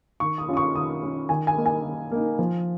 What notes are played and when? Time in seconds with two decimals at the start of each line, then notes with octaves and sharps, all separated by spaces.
0.20 D#3 C#6
0.38 D#6
0.48 C#4 F4
0.53 D#6
0.57 C#6
0.75 D#3 D#6
1.02 C#4 F4
1.29 D#3 G#5
1.47 G#5
1.57 A#3 D#4
1.66 G#5
1.84 D#3
2.11 A#3 D#4
2.39 F3